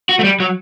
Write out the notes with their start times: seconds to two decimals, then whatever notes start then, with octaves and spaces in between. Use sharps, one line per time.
0.09 F#4
0.19 A3
0.24 G3
0.40 F#3